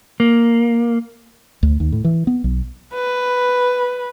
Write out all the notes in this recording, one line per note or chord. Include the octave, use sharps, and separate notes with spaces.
A#3
D2
D#2
A2
E3
B3
B1
B4